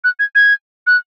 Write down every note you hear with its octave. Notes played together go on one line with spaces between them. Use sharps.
F#6
G#6
G#6
F#6